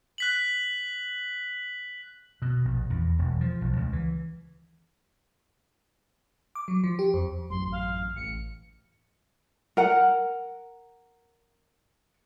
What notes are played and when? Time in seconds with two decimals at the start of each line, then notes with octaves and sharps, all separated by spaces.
0.18 F#6 B6 F#7
2.42 B2
2.65 A#1
2.90 E2
3.19 E1
3.41 F3
3.61 B1
3.77 C#2
3.93 E3
6.55 D6
6.68 F#3
6.84 F3
6.99 G4
7.14 F2
7.50 A1 F#2 C6
7.72 F5
8.16 A1 C#7
9.77 A#4 F#5